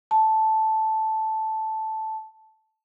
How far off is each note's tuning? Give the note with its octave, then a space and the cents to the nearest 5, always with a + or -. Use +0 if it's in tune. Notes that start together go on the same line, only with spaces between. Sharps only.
A5 -5